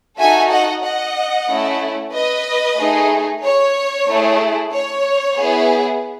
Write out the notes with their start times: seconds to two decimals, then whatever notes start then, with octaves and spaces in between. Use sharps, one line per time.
0.17 D#4 F#4 A4 E5 G#5
0.50 D#5 F#5
0.82 D#5 F#5
1.48 A3 C#4 E4
2.12 B4 D#5
2.78 A3 D#4 G#4
3.42 C#5
4.08 A3 E4 G#4
4.72 C#5
5.37 B3 E4 G#4